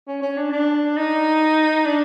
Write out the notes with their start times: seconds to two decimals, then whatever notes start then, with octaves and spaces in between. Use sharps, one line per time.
0.08 C#4
0.22 C#4
0.37 D4
0.52 D4
0.97 D#4
1.86 D4